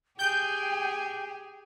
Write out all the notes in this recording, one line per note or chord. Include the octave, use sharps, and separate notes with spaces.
G4 G#4 G5 G6